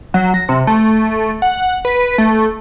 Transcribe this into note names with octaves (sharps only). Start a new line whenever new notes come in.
F#3
A#6
C3
A3
F#5
B4
A3